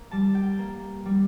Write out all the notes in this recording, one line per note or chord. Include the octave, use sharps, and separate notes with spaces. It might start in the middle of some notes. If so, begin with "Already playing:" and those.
Already playing: A#3
G3 A5
G5
A#3
G3